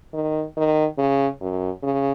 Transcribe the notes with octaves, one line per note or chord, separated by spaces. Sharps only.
D#3
D#3
C#3
F#2
C#3